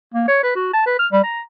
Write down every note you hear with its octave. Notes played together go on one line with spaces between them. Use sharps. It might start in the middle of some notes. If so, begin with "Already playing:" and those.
A#3
C#5
B4
F#4
A5
B4
F6
G3
A#5